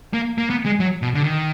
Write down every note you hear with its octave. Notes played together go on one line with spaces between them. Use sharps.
A#3
A#3
B3
G#3
F#3
B2
D3
D#3